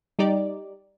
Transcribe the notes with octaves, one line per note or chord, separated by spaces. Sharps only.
G3 D#4 G4 D5